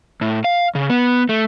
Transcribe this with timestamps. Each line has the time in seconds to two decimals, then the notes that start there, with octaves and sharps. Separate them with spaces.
0.21 A2
0.44 F5
0.75 C#3
0.90 B3
1.29 A3